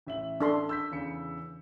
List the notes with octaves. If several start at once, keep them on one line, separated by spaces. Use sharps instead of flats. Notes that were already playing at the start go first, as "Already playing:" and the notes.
A1 E5 F#7
D4 A4 C6
E6 G6 B6
E2 C#3 C#7